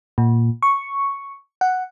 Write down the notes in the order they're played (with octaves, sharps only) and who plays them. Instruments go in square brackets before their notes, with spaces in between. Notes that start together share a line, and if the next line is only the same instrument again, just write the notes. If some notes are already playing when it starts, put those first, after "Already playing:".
[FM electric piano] A#2
C#6
F#5